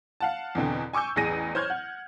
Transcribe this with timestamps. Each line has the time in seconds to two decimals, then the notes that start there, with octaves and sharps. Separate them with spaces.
0.20 F5 F#5 A5
0.55 E2 B2 D3 C4
0.93 G#5 C#6 D6 E6 G6
1.16 A1 E2 G#4 A#6 D#7
1.55 C5 C#5 F6 G6 G#6
1.70 F#5